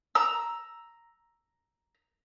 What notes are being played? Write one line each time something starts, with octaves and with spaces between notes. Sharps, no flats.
A#5 E6